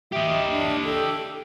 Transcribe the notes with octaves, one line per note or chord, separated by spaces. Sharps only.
G4 D#5 E5
D4
A4